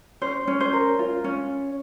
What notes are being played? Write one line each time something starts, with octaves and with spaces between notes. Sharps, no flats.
C#4 C5
C#4
C5
A#4
F4
C#4